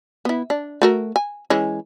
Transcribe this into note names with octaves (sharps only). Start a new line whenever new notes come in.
B3 E4
D4
A3 F#4 A#4
G#5
E3 G#3 C#4